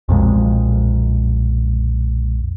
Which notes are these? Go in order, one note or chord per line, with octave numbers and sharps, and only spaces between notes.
B1 F2 A#2 G#3